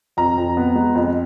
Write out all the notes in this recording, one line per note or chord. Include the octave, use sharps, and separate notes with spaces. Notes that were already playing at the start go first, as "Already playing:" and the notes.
F2 A#5
F2
B3
G#3
F2